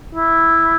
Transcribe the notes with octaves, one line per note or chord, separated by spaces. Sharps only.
E4